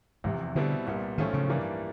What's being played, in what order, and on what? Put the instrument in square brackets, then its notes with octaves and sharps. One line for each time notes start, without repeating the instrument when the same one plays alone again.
[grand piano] F1 E2 C3 [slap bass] G#2
[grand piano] B2 G3 C4 E4 [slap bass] D3
[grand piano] C2 A#2 G3 B3
[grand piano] B1 A2 F3 A3 C#4 [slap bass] D#3
[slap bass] C#3
[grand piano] G2 E3 G3 A#3 D4